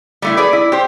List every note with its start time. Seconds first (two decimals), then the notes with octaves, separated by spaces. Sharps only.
0.22 G3 A3 E4
0.37 G#4 B4 D5
0.53 E4
0.72 G4 C5